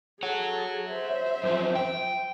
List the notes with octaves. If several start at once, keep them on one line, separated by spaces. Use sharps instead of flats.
G#4 A4 C#5 F#5
C5 E5
F#2 F3
G5